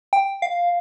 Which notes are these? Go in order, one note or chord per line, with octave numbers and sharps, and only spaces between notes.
G5
F5